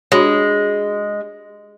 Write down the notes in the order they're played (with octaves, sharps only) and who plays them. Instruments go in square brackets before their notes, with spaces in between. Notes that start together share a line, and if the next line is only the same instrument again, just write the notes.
[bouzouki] G#3 [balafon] D4 F#4 C#5